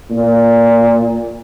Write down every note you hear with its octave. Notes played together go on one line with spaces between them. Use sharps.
A#2